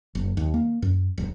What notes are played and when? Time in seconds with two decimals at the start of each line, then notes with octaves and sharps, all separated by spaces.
0.15 F#1
0.37 D#2
0.54 A#3
0.82 F#2
1.18 D1